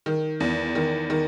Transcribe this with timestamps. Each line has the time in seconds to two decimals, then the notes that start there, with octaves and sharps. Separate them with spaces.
0.06 D#3
0.40 E2
0.75 D#3
1.10 D#3